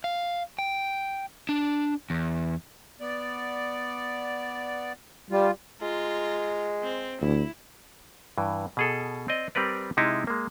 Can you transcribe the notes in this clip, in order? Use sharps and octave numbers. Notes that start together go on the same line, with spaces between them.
F5
G5
D4
E2
B3 D5
G3 F4
G#3 F4 A#5
C4
D2 E4
G2 E3
B2 G#4 A4
C4 D5 D#5
G3 C4 A#4 B4 D5
C3 G#3 D#4 E4
G#3 A#3